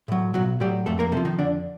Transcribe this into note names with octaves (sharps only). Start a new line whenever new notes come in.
A2 F#3
B1 F#3 F#4
A2 F#3 G3 G4
F2 A3 A4
A#3 A#4
C3 F3 A3 A4
D#3 D#4
F2 D3 D4